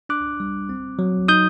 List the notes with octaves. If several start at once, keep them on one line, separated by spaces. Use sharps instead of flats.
D4 D6 F#6
G3
C4
F#3
D#4 D#6 G6